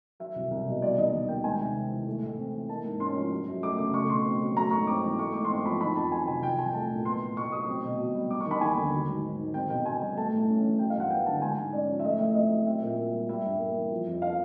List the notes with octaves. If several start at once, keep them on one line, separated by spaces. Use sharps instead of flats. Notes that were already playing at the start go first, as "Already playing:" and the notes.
F#3 E5
C2
C2
B2
G3 D5
D#2 D#5
D#2
D#3 G5
G#3 G#5
C3
C4
E3
A3
A2
C4
E3
A#3 A5
G#2
C#4 C6
F3
F#3
F#2
A3 D6
C#3 D6
A3 C#6
B2 C6
C4
F#3
A3 A#5
G#2 C#6
C4 D6
E3
A3 C#6
G#2 D6
C6
C4 C#6
F3 B5
D#3 B5
F2 A5
F#3 G#5
C3 G#5
F3 G5
C2 G#5
A3 A5
A#2
B3 C6
A2
A2 C#6
F#3 D#6
C4
B2
B2
G3
G3 D6
C#6
D#2 B5
D#2 G#5
D3
F#3
G#2
G#2
D#3
C4 G5
B2 G5
B2 G#5
G3
A3 A5
A2
C#4
E3
F#3 G5
F5
G2
F#5
B3 G5
D3 A5
G#3 G#5
G#2
C#4 D5
F3
E5
A3 D#5
A2 E5
C4 D#5
F#3
C4 E5
A#2
A#2
G3
G3 E5
G2
A#3
E3
F3
F2
F5